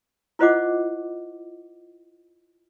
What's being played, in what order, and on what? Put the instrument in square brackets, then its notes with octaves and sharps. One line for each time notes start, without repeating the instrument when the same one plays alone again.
[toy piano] E4 F4 C5 D#5 F#5 D6